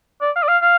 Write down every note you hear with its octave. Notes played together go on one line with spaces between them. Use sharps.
D5
F5
D5
F5
F5